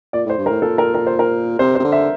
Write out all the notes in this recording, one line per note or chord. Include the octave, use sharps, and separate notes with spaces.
A#2 D5
A2 C5
G2
A#4
A2
A#2 A4
A#4
A#4
C5
A#4
C3 C5
C5
C3
D3
E5